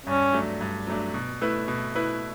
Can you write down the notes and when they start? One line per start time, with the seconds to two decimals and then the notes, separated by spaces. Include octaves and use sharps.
0.06 G2 C#4
0.33 F#3 A3 D4
0.61 G2
0.87 F#3 A3 D4
1.14 B2
1.41 A3 E4 B4
1.68 B2
1.95 A3 E4 B4